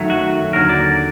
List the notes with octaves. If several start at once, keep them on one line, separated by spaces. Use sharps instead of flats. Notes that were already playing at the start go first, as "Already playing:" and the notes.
Already playing: F#2 D#3 F#3 A3
F#4
D#2 D3 F#3 A#4
D5